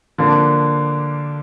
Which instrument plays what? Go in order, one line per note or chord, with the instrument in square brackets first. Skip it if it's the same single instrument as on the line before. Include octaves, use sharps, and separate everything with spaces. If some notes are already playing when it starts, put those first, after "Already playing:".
[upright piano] D3 F3 A#3 D4